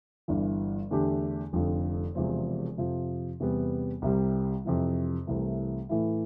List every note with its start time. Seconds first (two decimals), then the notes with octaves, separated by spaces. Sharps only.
0.28 G1 G2 E3
0.91 E2 D3 A3 D4 G4
1.53 F1 F2 D3 F3
2.15 E1 E2 C3 F3 C4
2.77 F2 C3 F3
3.40 E2 C3 G3 B3
4.02 C2 C3 G3
4.65 F2 C3 E3
5.27 C2 C3 E3 A3
5.89 A2 E3 A3 E4